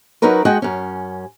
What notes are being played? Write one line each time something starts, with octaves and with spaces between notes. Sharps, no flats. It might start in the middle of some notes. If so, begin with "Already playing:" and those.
F#3 C#4 D#4 F#4 A#4 B4
G#3 F#4 D#5 F#5 G5
F#2 C#4